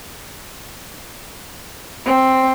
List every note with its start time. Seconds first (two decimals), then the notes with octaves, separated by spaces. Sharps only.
2.06 C4